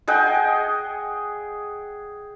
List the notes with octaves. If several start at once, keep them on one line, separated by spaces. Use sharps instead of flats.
G#4 D#5 F#5 G5